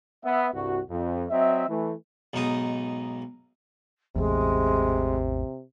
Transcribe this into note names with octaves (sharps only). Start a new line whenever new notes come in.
B3 E5
C2 G2 F#4
F2
F#3 C4 D#5 E5
E3 A3
B1 G#2 D#4 D#6
A1 E2 C3 G#3